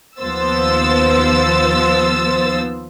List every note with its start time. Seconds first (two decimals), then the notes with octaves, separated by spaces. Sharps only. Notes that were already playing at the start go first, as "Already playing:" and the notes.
0.20 D#2 F3 B3 C5 E6 A6